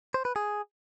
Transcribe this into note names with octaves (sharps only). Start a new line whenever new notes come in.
C5
B4
G#4